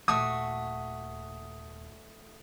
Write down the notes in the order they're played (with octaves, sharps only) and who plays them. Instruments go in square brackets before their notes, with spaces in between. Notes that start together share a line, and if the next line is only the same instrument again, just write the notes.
[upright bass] D#1 [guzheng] A3 F#4 [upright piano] D#6